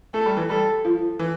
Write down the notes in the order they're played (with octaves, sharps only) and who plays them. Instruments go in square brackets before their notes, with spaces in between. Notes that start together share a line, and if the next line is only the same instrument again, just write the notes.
[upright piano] A3 [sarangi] A4
[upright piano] G3
E3
[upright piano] G3 [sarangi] A4
[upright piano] F3
E3